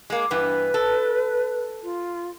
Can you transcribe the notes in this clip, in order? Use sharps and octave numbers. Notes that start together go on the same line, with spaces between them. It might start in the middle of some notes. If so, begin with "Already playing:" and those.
G#3 A#3
G2 E3 B3 B4
A4
F4